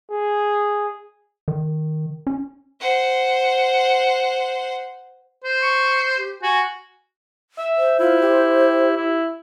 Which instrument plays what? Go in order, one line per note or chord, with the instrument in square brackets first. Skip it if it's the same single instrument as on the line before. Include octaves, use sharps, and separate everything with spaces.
[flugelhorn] G#4
[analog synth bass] D#3
C#4
[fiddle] C5 F#5
[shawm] C5
[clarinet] C#6
G4
[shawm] F#4 [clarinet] G#5
[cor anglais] E5
[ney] C5
[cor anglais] E4 [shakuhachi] F4
[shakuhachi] G4
[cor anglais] E4